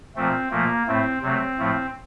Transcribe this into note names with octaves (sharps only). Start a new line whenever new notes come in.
A#2 F3 A3 C4
A#2 F3 A3 A#3
A2 A3 C4
C3 F#3 A3 C4
A2 F3 A3